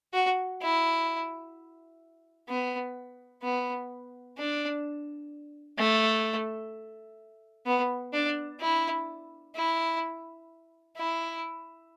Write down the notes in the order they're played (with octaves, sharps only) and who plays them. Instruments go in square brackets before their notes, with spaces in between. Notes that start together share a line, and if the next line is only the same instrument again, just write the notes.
[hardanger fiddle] F#4
E4
B3
B3
D4
A3
B3
D4
E4
E4
E4